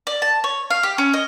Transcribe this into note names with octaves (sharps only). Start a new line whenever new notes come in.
D5
A5
C#5
F5
G4
C#4
D#5